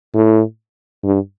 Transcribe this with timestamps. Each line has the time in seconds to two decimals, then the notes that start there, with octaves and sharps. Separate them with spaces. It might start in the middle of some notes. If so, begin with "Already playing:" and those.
0.15 A2
1.04 G2